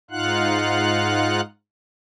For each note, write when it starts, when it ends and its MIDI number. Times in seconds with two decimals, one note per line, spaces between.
0.11 1.41 44
0.11 1.41 63
0.11 1.41 65
0.11 1.41 77
0.11 1.41 78
0.11 1.41 90